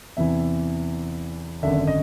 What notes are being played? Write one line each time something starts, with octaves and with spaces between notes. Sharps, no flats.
E2 C3 E3 E5
G#1 F#2 D3 E5
D#5